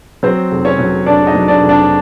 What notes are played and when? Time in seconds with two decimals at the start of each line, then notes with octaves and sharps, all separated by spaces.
0.23 F#3 C4 C5
0.51 F1
0.65 C#4 C#5
0.79 F#3
1.06 F1 D4 D5
1.27 D#4 D#5
1.35 F#3
1.48 D4 D5
1.62 F1
1.69 D4 D5